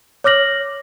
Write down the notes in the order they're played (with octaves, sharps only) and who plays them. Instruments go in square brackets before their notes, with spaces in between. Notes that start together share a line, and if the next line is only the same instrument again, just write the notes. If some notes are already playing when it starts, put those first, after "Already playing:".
[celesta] C#5 D6 F6 A#6 F#7